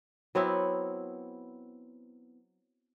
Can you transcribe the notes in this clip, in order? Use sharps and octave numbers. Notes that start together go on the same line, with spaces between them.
F#3 B3 C4 E4